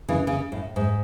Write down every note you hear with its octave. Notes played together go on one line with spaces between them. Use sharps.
C#3 E3
C#3
A2
G#2